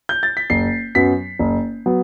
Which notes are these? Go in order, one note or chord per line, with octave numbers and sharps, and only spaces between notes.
G6
A6
B6
F#1 C7
F#2 F#3 B3 B6
F#1
F#3 B3